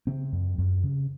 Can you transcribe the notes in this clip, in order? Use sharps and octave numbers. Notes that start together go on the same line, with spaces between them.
C#3 C4
F#2
F#2
C#3